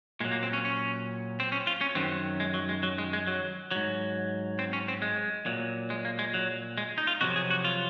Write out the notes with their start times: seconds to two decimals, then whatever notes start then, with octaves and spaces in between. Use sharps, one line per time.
0.20 A#2 G#3
0.25 F#3
0.31 A#3
0.43 C4
0.53 C#4
0.65 C#4
1.40 C4
1.52 C#4
1.67 F4
1.81 C#4
1.95 F#2 D#3 F#3 C4
2.40 G#3
2.54 F#3
2.69 G#3
2.83 F#3
2.98 G#3
3.13 G#3
3.27 F#3
3.71 G#2 F#3
4.59 C4
4.73 C#4
4.88 C4
5.02 G#3
5.46 A#2 F#3
5.90 G#3
6.05 A#3
6.19 G#3
6.34 F#3
6.78 G#3
6.98 D#4
7.07 F4
7.21 F2 C3 F#3 F#4
7.36 G#4
7.50 F#4
7.64 F4